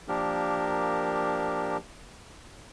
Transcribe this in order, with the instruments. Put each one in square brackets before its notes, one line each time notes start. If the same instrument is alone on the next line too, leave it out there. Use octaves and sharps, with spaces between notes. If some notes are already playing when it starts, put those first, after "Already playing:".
[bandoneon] F3 A#3 D4 G4 A#4